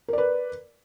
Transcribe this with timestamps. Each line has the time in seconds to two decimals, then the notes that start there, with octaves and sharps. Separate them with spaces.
0.08 A#4
0.13 D5
0.18 B4